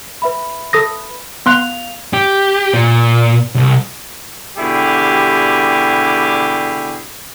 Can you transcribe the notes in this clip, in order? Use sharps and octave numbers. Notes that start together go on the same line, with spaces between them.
B4 E5 B5
A4 D#6 A#6
B3 F5 C6 F#6 F7
G4
A#2
C2
B2 D3 G3 E4 G4 G#4